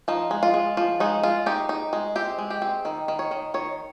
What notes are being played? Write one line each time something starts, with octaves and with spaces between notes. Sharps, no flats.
F3 D#4
G#3
F4
G#3
F3 F4
G#3 D#4
G#3 F4
D#4 G4
D#4
G#3
C4 G4
G#3
G4
C4
D#3
D#3
C#5
D#3
D#3 C#5